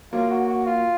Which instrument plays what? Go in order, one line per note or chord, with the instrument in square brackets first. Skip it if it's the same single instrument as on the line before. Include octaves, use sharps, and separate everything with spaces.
[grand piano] F#3 A#3 [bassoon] F4
[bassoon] F#4
F#4
F4